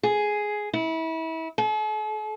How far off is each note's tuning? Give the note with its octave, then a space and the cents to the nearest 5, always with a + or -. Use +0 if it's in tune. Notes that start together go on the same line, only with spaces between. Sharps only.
G#4 +5
E4 -30
A4 -45